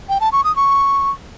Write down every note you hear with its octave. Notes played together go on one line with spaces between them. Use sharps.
G5
A5
C#6
D#6
C#6